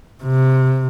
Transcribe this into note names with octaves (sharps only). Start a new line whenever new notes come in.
C3